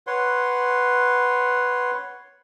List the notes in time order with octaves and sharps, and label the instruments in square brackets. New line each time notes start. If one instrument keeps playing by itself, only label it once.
[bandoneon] B4 C#5 F#5 C6